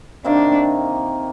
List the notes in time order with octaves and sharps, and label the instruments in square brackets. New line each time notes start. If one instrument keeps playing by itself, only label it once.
[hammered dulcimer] C3 D#3 A#3 D#4 [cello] D4